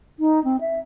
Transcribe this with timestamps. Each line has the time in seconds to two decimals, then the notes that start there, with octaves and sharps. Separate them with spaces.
0.19 D#4
0.44 C4
0.61 E5